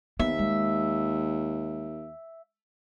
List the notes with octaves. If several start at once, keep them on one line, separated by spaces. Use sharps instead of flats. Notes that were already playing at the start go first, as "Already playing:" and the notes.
D#2 B3 E5
G#3